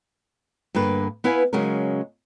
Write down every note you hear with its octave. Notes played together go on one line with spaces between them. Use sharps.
G2 D3 A#3 B4
B3 E4 B4 F5 G#5
C#3 F#3 G#3 C#4 A#4